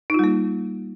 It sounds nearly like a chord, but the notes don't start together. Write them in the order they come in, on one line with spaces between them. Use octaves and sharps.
D#4 F4 G3 A#3